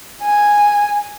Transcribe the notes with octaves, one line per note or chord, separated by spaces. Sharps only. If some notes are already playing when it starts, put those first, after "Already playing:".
G#5